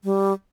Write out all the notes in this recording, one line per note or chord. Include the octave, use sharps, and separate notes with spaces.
G3